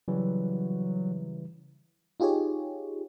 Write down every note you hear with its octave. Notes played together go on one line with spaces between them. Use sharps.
C#3 E3 F#3 G3
D#4 F4 G4 G#4 C#5